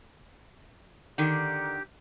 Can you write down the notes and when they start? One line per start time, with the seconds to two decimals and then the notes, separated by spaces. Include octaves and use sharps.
1.18 D3 D#3 G4